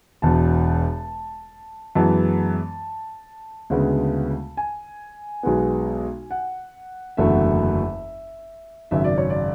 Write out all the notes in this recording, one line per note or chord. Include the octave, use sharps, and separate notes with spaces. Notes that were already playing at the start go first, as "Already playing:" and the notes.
E1 E2 B2 A5
F#2 E3 G#3 B3 A5
D2 C#3 G#3 B3
G#5
B1 B2 G#3 B3
F#5
F#1 E2 D3 F#3 A3 E5
G#1 F#2 C#3 E5
D5
C#5
D5